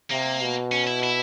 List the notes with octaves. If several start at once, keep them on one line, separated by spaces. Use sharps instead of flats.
C3 A#3
B2
C#4
E4
E4